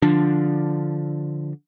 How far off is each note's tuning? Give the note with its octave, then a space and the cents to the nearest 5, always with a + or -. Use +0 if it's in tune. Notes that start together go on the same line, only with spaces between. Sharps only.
D3 +0 F3 +0 D4 +0